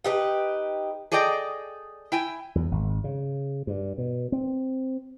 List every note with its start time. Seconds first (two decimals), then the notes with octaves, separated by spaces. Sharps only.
0.04 D#4 G4 B4
1.12 G#4 A4 D5 D#5 G5
2.12 E4 G5 G#5
2.55 E2
2.71 G#1
3.04 C#3
3.67 G2
3.98 B2
4.32 C4